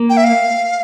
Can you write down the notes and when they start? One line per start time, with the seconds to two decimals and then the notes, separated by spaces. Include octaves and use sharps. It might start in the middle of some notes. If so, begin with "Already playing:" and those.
Already playing: A#3
0.09 G5
0.17 E5
0.24 F5